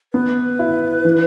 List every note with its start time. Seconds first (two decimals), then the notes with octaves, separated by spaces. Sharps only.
0.14 B3 B4
0.59 E4
1.05 E3